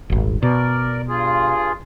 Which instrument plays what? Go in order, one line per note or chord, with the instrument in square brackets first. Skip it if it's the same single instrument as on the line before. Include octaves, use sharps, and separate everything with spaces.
[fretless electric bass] D#1 G#1
[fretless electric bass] B2 [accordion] A#4 D5
[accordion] G2 F4 G#4